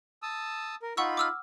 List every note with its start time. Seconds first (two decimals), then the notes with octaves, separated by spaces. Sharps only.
0.23 A5 D#6 E6
0.82 A#4
0.97 D#4 F4 F#5 B5 C#6 E6
1.17 D6 E6 F6